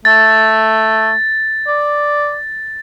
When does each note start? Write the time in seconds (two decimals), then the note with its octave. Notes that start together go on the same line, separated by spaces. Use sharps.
0.05 A3 A6
1.67 D5